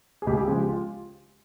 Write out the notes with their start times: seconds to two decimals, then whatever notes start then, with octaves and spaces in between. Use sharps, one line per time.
0.22 G#4
0.27 C#2 G4
0.33 G#4
0.37 G4
0.48 C#3 F3 G#3 G#4
0.59 G4
0.69 F4